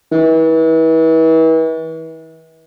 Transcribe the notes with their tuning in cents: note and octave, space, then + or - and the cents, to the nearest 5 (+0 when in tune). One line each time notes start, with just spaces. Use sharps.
E3 -35